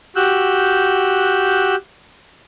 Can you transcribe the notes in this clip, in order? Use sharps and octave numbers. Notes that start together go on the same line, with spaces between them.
F#4 G4 E6 F#6 G6